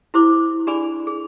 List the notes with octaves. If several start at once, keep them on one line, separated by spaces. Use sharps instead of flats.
E4 G4 C5 D6
D4 G4 G#4 D5 G#5 B5
G#4